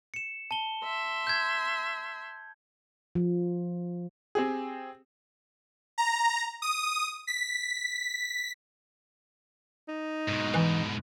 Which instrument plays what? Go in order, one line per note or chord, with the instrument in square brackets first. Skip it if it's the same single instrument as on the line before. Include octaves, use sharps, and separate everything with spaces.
[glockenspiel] C#7 E7
A5 G7
[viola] E5 C6
[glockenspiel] G6 G#6
[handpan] F3
[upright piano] C4 G4 G#4
[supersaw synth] A#5
D#6
B6
[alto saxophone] D#4
[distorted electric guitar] G#2 B2
[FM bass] E3